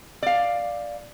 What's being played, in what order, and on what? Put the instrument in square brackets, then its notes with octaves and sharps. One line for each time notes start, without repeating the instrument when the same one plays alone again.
[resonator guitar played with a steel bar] D5 F5